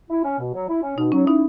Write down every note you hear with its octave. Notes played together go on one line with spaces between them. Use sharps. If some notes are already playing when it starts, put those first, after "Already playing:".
E4
C#4
B2
F#3
E4
C#4
B2 D#4
F#3 C#4
D#4 E4